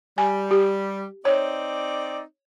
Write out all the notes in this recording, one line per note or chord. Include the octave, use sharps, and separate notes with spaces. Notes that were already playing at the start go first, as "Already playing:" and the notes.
G3 G#5
G4
C4 D#4 C#5 D5